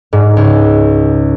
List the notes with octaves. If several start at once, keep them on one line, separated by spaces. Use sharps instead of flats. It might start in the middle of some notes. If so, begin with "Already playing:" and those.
G#2
C#2